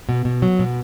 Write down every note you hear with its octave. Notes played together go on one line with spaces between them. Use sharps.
B2
B2
F#3
B2